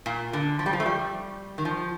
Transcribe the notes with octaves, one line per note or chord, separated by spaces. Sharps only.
A#2
D3
F3
G3
F3
A3
G3
D#3
F3